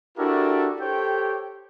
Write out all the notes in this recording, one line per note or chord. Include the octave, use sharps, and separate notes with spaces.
D4 E4 F#4 G4 A4 A#4
G4 A4 C5 C#5 G5